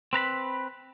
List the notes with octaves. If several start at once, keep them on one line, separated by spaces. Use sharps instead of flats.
C4 B4 A#5 B5